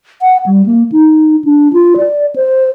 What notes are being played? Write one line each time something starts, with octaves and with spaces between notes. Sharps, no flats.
F#5
G3
A#3
D#4
D4
F4
D5
C5